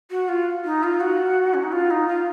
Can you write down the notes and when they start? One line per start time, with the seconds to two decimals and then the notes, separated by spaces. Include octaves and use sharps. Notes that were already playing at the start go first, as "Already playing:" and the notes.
0.11 F#4
0.28 F4
0.65 D#4
0.83 F4
1.00 F#4
1.54 C#4
1.63 D#4
1.72 F4
1.91 D#4
2.08 F4